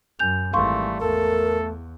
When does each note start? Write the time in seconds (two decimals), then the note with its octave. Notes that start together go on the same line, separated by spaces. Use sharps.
0.19 F#2 G#5 G6 F7
0.53 G#1 E3 G3 A3 F5 C6 C#6
1.00 E2 A3 A4 A#4